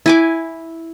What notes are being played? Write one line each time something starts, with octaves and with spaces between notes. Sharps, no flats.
E4 G#5 D6